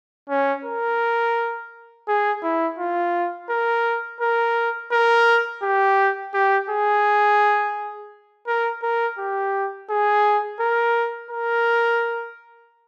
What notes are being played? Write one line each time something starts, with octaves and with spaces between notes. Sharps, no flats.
C#4
A#4
G#4
E4
F4
A#4
A#4
A#4
G4
G4
G#4
A#4
A#4
G4
G#4
A#4
A#4